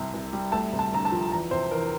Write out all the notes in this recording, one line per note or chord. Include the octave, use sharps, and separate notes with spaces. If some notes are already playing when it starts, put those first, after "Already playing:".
Already playing: C2 C3
C2
G3
A3 A5
C3
A5
D2 A#5
A5
F3
E2 A#5
C3 C5
E2 A#4